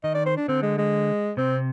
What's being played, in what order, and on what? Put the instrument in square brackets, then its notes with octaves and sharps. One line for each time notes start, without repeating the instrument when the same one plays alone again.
[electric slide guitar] D#3 [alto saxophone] D#5
[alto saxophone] D5
C5
D4
[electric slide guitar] D3 [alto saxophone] C4
[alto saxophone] G#3
G#3
[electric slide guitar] C3 [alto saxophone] C4